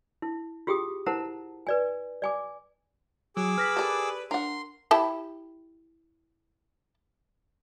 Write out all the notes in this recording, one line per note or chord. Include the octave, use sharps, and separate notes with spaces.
E4
F4 G4 G#4 G5 D#6
E4 A#4 C5 F#5 A5 A#5
B4 D5 G#5
D5 G#5 D6
F#3 G#4 D6 E6
B4 F6 A#6 B6
G4 A4 A#4 D5
D4 A#4 F#5 C6
E4 G4 A5